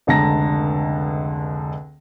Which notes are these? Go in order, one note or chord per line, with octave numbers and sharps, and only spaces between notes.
F1 C#2 D3 A5 A#5 A#6